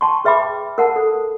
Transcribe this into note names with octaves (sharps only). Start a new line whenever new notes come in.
G5 A5 C6 C#6
G#4 B4 E5 G5 B5 D6
A#4 F#5 A5
A4 C5